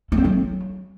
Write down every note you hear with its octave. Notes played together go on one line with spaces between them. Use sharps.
A3
C4
F#3